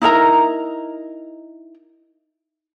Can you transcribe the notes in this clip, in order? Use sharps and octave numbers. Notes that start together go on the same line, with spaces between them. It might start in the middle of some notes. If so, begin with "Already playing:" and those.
D#4 E4 A#4 A#5